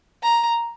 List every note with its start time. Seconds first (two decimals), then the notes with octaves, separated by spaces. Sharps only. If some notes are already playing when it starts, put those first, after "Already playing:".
0.23 A#5